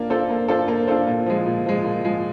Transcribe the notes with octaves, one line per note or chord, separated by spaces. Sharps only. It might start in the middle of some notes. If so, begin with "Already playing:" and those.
Already playing: A#3 D4 F4
D4 F4 A4 C5
A#3
D4 F4 A4 C5
A#3
D4 F4 A4 C5
A#2
F3 G#3
A#2
F3 G#3
A#2
F3 G#3